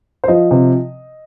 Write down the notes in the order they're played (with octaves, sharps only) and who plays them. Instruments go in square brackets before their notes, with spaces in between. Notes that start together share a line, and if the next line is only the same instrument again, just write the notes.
[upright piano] C5
F3 D#5
C3